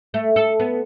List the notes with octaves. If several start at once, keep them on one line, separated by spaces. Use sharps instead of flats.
A3
A4
B3